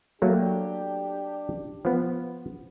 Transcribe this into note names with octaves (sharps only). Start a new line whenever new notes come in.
F#3 A3 A#3 D4 G4
F3 B3